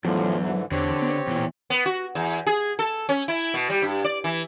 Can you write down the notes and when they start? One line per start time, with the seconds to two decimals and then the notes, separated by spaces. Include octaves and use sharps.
0.05 E2 A2 D3 F3 F#3
0.41 G#2 D3 E3
0.72 E2 D3 C4 G4 C#5
1.02 B3
1.27 E2 A#2 E3
1.70 B3
1.86 F#4
2.15 E2
2.47 G#4
2.79 A4
3.09 C#4
3.28 E4
3.54 B2
3.70 G3
3.82 G2
4.05 D5
4.24 E3